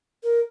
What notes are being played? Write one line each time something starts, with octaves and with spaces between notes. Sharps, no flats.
A#4